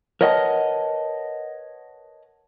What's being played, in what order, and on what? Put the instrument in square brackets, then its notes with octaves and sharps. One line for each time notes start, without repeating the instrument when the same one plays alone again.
[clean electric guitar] A#4 B4 C#5 D#5 F#5 A5